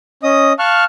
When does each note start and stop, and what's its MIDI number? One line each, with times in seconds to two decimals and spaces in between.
0.23 0.53 61
0.23 0.53 75
0.23 0.53 87
0.59 0.84 77
0.59 0.84 81
0.59 0.84 85
0.59 0.84 89
0.59 0.84 90